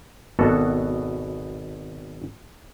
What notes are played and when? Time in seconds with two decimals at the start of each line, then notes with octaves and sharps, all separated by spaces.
0.39 G#1 B2 B3 F#4 A4